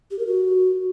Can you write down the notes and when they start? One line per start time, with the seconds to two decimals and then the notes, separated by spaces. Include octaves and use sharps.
0.11 G4
0.19 A#4
0.27 F#4